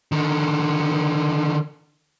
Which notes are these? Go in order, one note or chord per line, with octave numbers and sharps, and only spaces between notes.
D3 D#3